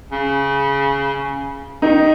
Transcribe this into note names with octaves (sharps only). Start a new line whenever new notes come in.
C#3
D#3 D#4